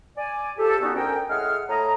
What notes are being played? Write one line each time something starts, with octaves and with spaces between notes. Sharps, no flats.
D5 G#5
F3 G4 A4
G3 G#3 B3 C#4 D#4 F#4
D2 C#4 A#4 G5
A2 G#3 G#4 F#5 F6
A2 D#5 A#5